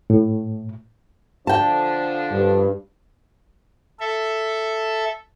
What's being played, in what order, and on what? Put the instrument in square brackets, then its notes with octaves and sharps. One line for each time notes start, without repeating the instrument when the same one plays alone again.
[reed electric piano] A2
[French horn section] D3 F3 D4 [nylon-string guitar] G5 A5
[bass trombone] G2
[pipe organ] A4 E5